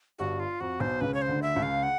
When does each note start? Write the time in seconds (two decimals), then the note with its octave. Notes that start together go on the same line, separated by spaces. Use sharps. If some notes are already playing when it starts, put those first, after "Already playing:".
0.19 G1 G2 F#4
0.40 F4
0.60 F2 F#4
0.80 B1 B2 C5
1.01 C#2 C#3 B4
1.14 C#5
1.22 C5
1.28 D2 D3
1.42 E5
1.55 C#2 C#3
1.63 F5
1.83 F#5